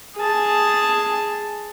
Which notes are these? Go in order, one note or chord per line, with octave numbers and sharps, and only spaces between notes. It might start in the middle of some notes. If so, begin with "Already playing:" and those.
G#4 A5